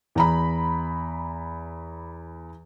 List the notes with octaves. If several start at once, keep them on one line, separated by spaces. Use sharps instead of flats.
E2 A#5 B5